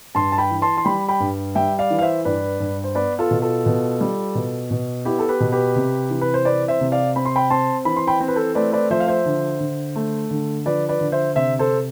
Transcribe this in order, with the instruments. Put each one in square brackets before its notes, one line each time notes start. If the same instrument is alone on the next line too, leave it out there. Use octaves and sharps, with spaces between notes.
[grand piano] G2 A5 C6
A5
G5 B5
E3
A5 C6
C6
G3 G5 B5
G5 B5
G2
G3 E5 G5
D5 F5
E3
F5
C5 E5
G2 B4 D5
G2
C5
B3 B4 D5
F4 A4
B2
F4 A4
B2
G3
B2
B2
B3 E4 G4
A4
G4 B4
B2
G4 B4
C3
E3
B4
C5
C4 B4 D5
C5 E5
C3
D5 F5
C4 B5
C6
G5 B5
C4 A5 C6
E3 B5
C6
G5 B5
C4 C5
B4
A4 C5
A3 B4 D5
B4 D5
F3 C5 E5
F5
C5 E5
D3
D3
A3
D3
F3 B4 D5
B4 D5
D3
C5 E5
C3 C5 E5
A4 C5